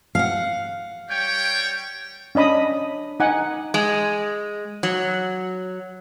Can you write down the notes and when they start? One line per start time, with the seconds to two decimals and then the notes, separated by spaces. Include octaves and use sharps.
0.15 F5 F#5
1.10 G3 C#5 G5
2.35 C#4 D4 D#5 B5 D#6
3.20 D#4 F#5 G#5
3.74 G#3
4.83 F#3